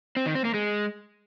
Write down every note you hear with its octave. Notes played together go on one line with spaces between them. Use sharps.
C4
D#3
C4
A#3
G#3